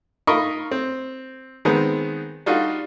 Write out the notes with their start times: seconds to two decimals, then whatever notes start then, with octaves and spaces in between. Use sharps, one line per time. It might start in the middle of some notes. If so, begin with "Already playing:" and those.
0.27 D#4 F4 A#4 D#5 B5 C#6
0.71 C4
1.65 D#3 G#3 B3 C4
2.46 G3 D4 D#4 F4 F#4